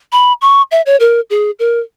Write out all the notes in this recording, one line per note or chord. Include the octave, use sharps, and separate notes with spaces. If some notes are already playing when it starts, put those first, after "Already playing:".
B5
C#6
E5
C#5
A#4
G#4
A#4